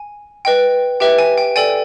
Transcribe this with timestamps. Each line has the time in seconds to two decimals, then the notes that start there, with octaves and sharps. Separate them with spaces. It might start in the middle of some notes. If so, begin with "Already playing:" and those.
Already playing: G#5
0.45 B4 D#5 G5
1.00 G4 B4 E5 G5
1.18 G#5
1.37 G5
1.56 A4 D5 G5 G#5